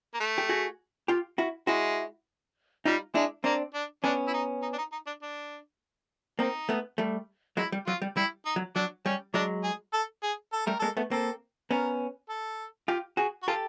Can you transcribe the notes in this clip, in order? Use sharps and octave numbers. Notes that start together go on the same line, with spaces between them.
A#3
A3
G4
F#4 G#4
F4 G4
E4 F#4
G#3 E4 F#4
G3 D#4 F4
G#3 D4 E4
A#3 C4 D4
D4
B3 C#4 D4
E4
D#4
D#4
D4
D#4
D#4
D4
D4
A#3 C4 D#4
A3 B3
G3 A3
F#3 G#3 E4
G3
F#3 F4
G3
G3 E4
D#4
F#3
F#3 D4
G3 C#4
F#3 G#3 D4
G#4
A4
G#4
A4
G3 A3 A#4
G#3 A#3 A4
A3 B3
A#3 C4 A4
B3 C#4 A#4
A4
F4 G4
F#4 G#4
F#4
F4 G4 A4